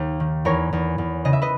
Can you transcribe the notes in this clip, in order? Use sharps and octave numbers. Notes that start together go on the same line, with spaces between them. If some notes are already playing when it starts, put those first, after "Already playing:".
Already playing: D#2
D#3
E2 A#4 C#5
E2
E2
C#3 D#5
E5
B4 D#5